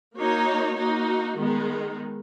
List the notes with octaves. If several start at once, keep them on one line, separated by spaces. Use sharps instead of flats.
A#3 D#4 F#4 C#5
A#3 D#4 F#4
D#3 G#3 B3 D#4